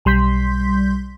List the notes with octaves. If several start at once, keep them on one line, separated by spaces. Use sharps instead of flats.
B1 G3 C6 G6 B6